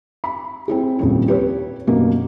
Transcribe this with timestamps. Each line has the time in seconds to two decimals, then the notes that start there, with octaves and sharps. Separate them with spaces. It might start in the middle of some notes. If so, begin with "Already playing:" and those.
0.24 B5
0.68 C4 E4 G#4
0.99 D#1 F2 C#4
1.28 G4 B4 C#5
1.87 F#2 B2 A#3